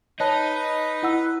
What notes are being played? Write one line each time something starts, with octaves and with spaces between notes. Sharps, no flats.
D#4 B4 C#5 A5
E4 F#5 E6